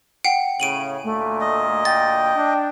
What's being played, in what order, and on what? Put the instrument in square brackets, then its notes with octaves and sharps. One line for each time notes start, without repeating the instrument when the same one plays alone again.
[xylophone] F#5 G5 C7
[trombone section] A2 C#3 [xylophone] D7 D#7 F#7
[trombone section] D2 A#2 [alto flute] A3
[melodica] D#5
[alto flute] G5 [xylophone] A6
[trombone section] D4